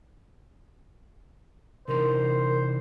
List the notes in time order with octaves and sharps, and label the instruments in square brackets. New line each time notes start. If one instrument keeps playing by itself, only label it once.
[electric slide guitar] C3 E3 D#4 [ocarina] A#4 [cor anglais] C5